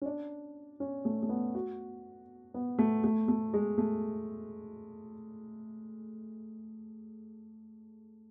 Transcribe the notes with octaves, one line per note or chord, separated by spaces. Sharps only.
C#4
D4
C#4
A3
A3
B3
F#4
B3
A3
A3
A3
G#3
A3